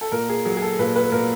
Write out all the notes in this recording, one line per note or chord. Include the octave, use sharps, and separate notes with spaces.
A4
A#2 A#4
G#4
F#3 G#4
G#4
A4
A#2 B4
B4
A#2 A#4